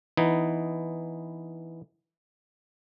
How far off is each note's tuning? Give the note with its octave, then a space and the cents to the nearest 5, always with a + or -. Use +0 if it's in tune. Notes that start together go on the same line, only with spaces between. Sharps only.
E3 +0 B3 +5 D#4 +0